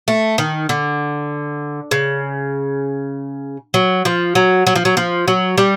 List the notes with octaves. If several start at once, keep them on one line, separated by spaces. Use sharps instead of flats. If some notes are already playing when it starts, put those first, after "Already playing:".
A3
D#3
D3
C#3
F#3
F3
F#3
F#3
F3
F#3
F3
F#3
G3